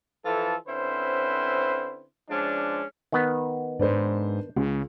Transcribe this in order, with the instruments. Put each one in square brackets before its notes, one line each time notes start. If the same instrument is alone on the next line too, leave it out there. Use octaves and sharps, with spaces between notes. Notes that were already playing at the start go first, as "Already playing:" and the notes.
[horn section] E3 F3 E4 F4 A4
D3 C4 C#4 E4 B4 C5
F3 G#3 C#4 D4
[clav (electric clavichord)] D#3 B3
[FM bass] G#2 [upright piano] D4 B4 C5
[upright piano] C#2 [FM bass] C#3